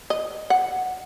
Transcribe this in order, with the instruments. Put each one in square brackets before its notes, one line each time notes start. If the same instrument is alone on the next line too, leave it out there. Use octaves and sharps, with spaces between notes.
[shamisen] D#5
F#5